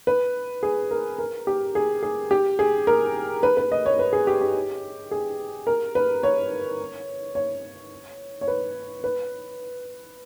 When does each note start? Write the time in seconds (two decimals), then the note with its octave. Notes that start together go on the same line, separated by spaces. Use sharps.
0.07 B4
0.63 G#4
0.91 A#4
1.18 A#4
1.47 G4
1.75 G#4
2.03 G#4
2.31 G4
2.59 G#4
2.87 A#4
3.43 B4
3.57 B4
3.72 D#5
3.86 C#5
3.99 B4
4.13 G#4
4.27 G4
4.41 G4
5.11 G#4
5.67 A#4
5.95 B4
6.23 C#5
7.35 C#5
8.41 C#5
8.48 B4
9.04 B4